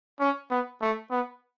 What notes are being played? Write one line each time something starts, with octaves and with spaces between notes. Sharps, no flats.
C#4
B3
A3
B3